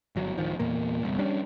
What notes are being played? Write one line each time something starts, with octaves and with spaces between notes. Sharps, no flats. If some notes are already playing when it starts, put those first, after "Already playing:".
G1 F#3
D1 D#3 F3
E2 A#2 A#3
G1 C2
G3 C#4 D4